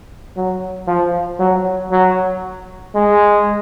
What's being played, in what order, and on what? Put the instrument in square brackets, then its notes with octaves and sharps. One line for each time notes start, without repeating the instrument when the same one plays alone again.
[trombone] F#3
F3
F#3
F#3
G#3